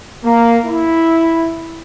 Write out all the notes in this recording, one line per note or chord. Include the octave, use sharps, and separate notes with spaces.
A#3
E4